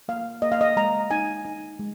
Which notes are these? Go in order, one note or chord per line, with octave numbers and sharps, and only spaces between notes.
A#3 F5
A#3 D#5
F5
D#5
G#3 A#5
D#4 G#5
D#4
G#3